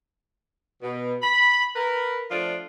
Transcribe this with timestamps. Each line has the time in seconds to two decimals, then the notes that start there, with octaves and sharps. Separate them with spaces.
0.82 B2
1.22 B5
1.76 A#4 B4
2.31 F3 A3 D4 F4